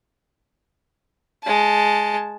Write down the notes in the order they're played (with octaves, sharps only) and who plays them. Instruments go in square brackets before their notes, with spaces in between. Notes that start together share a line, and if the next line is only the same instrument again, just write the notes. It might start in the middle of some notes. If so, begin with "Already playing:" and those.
[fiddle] G#3 A5